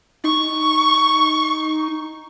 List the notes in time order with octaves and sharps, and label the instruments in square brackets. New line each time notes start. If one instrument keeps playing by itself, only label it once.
[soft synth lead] D#4 [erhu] C#6